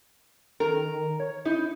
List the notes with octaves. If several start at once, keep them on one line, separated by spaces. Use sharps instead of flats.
D#3 A#4
C#5
D#4 E4